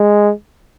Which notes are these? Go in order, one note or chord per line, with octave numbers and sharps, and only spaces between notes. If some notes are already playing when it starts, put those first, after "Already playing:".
Already playing: G#3